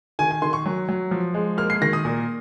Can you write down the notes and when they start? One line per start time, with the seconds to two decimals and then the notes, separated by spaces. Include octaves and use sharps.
0.19 D#3 G#5
0.31 G#5
0.42 D#3 C6
0.53 C#6
0.66 F#3
0.89 F#3
1.11 F3
1.34 G#3
1.57 A#3 F6
1.70 C7
1.81 D#3 A#6
1.93 D#6
2.05 A#2